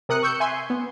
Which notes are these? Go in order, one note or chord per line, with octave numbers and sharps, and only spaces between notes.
C3 A#4 D#6 F#6 C#7
C#6 E6 G6 C#7
E5 G#5 C6
B3